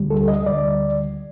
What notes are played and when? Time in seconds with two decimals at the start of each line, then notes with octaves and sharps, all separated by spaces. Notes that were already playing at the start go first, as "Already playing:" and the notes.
Already playing: D2 D3 G3
0.10 A4
0.28 D#5
0.46 D2 D3 G3 D5